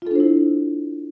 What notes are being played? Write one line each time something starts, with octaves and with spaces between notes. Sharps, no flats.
D4 E4 F4 A4 C5